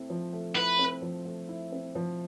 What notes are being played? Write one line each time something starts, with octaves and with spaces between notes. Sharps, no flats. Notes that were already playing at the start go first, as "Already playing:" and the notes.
Already playing: A3 C4 E4
F3
A3
E4 B4
C4
F3
A3
E4
C4
F3